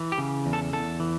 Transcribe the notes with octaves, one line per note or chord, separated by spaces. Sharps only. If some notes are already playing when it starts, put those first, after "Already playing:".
Already playing: E3
G4
C#3
E2
A4
E2 A4
E3